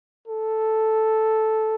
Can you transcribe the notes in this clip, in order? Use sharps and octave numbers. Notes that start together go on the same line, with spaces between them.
A4